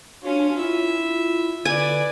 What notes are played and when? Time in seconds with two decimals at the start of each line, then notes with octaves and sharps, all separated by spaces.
0.23 C#4 D4 F4 F#4 C#5
0.56 E4 F4 E5
1.65 D3 B4 D5 G#5